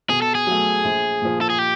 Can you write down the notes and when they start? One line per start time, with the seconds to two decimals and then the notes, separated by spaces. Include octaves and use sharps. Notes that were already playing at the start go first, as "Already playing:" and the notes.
0.09 B2 G#4
0.22 A4
0.35 G#4
0.47 F#3 A3
0.84 A#1
1.22 A#2 F3
1.41 A4
1.50 G#4
1.59 G4